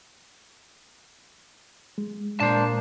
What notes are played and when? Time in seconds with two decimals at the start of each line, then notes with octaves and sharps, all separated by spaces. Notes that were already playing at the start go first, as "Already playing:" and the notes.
1.98 G#3
2.40 A#2 A#3 D4 C5 A5